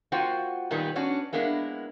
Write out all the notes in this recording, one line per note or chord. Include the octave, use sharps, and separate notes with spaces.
A#3 F4 F#4 C5 F#5 G5
A#2 D#3 G3 B3
B3 C#4 D4 F#4
G#3 A#3 B3 D4 E4